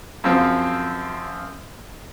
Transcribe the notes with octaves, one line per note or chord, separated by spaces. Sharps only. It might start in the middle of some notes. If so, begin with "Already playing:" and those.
F#2 C#3 F3 C4